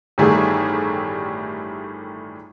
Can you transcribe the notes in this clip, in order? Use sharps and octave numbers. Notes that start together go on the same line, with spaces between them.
G1 A2 D#3 G3 A3 G#4